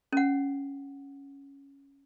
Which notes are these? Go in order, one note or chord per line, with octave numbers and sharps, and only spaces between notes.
C#4 F#5